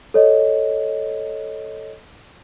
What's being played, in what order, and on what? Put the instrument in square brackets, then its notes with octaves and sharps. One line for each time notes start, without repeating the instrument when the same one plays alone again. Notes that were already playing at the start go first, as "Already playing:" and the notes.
[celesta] A4 C#5 D#5